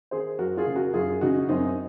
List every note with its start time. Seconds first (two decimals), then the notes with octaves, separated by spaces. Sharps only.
0.11 D#3 G#4 C5
0.39 F#2 F#4 A#4
0.57 F4 G#4
0.67 C#3
0.76 F#4 A#4
0.94 F#2 F4 G#4
1.21 C#3 D#4 F#4
1.49 F#2 C4 D#4